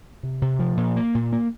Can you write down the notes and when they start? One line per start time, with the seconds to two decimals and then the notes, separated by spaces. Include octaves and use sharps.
0.23 C3
0.42 C3
0.59 F3
0.77 A#2
0.96 A#3
1.15 A#2
1.32 A#3